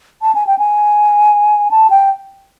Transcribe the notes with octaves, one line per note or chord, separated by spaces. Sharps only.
A5
G#5
G5
G#5
A5
G5